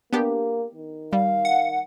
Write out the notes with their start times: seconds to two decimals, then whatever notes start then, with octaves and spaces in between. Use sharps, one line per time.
0.13 A#3 B3 D4 G4
0.75 D#3
1.13 G3 F5
1.45 F#5